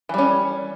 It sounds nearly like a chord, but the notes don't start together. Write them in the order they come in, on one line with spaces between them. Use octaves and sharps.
E3 G3 C#4